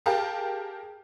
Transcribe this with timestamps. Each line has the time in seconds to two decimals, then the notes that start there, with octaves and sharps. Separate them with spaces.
0.06 G4 G#4 A#4 F5 G5 A5